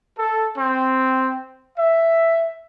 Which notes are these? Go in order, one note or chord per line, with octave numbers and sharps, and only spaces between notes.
A4
C4
E5